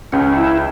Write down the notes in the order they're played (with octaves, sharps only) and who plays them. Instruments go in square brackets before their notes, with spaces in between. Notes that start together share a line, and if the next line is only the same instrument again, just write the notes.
[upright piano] C#2 [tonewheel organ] C#4
[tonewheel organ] E4